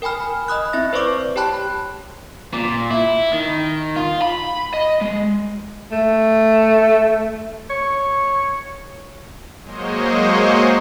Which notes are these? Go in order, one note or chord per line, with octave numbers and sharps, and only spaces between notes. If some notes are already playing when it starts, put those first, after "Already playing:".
A#4 G5 G#5 B5 F6
D#5 B5 D#6 F#6
C4 E4 E5 A#6
B4 C5 D5 C#6 D6
G4 C#5 G5 A5 B5 F#6
A#2
E4
D#3
F4
B5
D#5
G#3
A3
C#5
F#3 G#3 A#3 C5 C#5 D#5